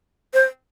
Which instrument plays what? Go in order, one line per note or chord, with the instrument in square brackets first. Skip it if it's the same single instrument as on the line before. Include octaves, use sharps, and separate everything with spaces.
[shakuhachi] C5